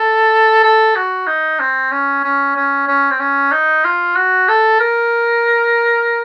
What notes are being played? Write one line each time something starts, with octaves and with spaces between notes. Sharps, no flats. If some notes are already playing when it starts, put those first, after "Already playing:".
Already playing: A4
A4
F#4
D#4
C4
C#4
C#4
C#4
C#4
C4
C#4
D#4
F4
F#4
A4
A#4